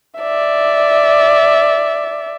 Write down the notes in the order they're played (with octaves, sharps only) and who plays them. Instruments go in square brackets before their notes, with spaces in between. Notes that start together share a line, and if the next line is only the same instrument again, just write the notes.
[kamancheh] D5 E5